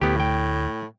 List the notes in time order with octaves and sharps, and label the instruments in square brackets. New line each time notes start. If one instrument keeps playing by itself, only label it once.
[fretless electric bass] D2 [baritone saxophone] A2 [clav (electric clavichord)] B3 G4
[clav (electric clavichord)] G5